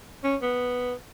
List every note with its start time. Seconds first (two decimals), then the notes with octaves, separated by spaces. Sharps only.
0.23 C#4
0.42 B3